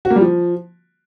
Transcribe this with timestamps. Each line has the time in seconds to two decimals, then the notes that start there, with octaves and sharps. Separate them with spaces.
0.05 F#4
0.10 A#3
0.16 G3
0.21 F3